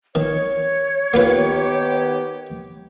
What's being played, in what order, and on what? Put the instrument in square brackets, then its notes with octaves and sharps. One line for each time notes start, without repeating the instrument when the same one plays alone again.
[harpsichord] D#3 [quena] C#5
[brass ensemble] D#3 B3 G4 [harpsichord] A#3 F4 B4